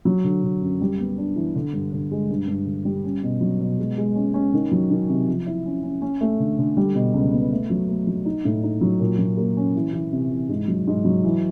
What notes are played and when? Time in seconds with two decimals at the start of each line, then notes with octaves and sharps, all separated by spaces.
0.05 F#3
0.24 D3
0.44 D3
0.61 F#2
0.81 G3
1.00 B3
1.18 D4
1.36 E3
1.56 D3
1.73 G2
1.92 D3
2.11 G#3
2.30 G2
2.48 G2
2.66 D3
2.85 G3
3.04 C#4
3.23 B2
3.41 F#3
3.61 B2
3.79 G#3
3.98 G#3
4.15 C#4
4.34 C#4
4.54 D#3
4.72 F#3
4.91 D#3
5.09 C3
5.28 F3
5.46 E4
5.66 C#4
5.83 C#4
6.02 C#4
6.21 A3
6.40 D3
6.59 D3
6.77 G3
6.95 B2
7.14 C#2
7.32 B3
7.52 A3
7.70 F#3
7.89 A3
8.07 F#3
8.25 D#4
8.45 A2
8.63 D#4
8.81 F#3
9.00 A#2
9.19 F#3
9.37 A#3
9.57 C#4
9.76 E3
9.93 E3
10.12 C3
10.31 E3
10.49 G#2
10.68 F#3
10.87 G#2
11.05 F#3
11.24 E3